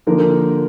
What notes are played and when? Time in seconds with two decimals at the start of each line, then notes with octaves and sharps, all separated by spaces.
0.07 D3 F3 A#3 A#4